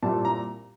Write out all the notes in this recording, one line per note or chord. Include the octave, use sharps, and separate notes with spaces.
A#2 G3 C4 E4 A5
A#5